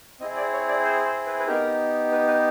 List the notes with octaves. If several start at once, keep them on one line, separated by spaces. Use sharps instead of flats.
C4 E4 G#4 D#5
D5
C#5
D5
C5
C5
B4
B4
B3 D#4 G4 A#4
B4
B4